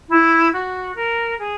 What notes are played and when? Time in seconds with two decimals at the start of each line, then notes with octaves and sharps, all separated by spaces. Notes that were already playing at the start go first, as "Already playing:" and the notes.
0.09 E4
0.53 F#4
0.96 A#4
1.39 G#4